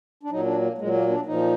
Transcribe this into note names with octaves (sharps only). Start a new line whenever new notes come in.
D4
A#2 F#3 D#4
D4
A#3
A#2 F#3 G#3
A#3
D4
A#2 F3 D#4